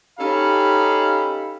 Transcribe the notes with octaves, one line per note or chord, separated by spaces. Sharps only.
C#4 D#4 G4 A4 F5 B5